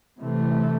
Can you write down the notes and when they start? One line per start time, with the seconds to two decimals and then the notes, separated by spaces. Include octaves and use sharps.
0.19 C3 E3 A3